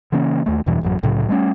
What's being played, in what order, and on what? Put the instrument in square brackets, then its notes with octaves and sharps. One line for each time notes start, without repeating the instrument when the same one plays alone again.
[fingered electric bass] C#3 E3 A#3 C#4
D#2 A3
E2 G2 B2 E3
A1 F#2 F#3
C2 A2 C#3 F#3
G3 A3 A#3 C#4